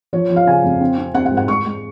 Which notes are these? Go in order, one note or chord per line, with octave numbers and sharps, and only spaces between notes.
F3 C#5
F3
F5
C#3 G#5
F2
C4
C4
C4 F#5
F#5
G#2
F#5
G#3 C#6
G#3